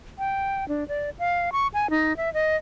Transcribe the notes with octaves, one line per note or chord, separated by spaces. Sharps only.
G5
D4
D5
F5
C#6
G#5
D#4
E5
D#5